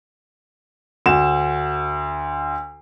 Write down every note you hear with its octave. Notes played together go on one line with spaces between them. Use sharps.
D2 E7